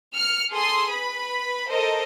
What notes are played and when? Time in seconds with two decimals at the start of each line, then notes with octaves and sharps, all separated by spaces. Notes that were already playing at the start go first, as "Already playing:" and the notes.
0.14 F6 C#7
0.53 G#4 A4 C6 D#6
0.92 B4 B5
1.70 A4 A#4 C5 D#5